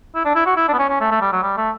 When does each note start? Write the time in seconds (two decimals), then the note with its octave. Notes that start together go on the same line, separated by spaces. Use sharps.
0.15 E4
0.25 D4
0.36 E4
0.46 F#4
0.57 E4
0.69 D4
0.73 B3
0.79 C#4
0.89 C#4
1.01 A3
1.11 A3
1.21 G3
1.33 F#3
1.43 G3
1.57 A3